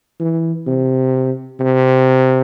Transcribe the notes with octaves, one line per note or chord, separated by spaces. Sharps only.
E3
C3
C3